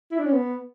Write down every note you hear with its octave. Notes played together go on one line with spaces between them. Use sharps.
E4
D4
C#4
B3